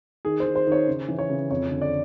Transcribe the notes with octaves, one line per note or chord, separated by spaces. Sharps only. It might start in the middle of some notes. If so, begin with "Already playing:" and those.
D#3 G#4
C5
D#3
C5
D#3 C#5
C#3
E3
C#5
C#3
F2 C#5
D3
D5